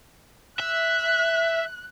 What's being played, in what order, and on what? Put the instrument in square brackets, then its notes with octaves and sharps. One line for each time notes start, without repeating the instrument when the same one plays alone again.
[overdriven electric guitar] E5 [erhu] F#6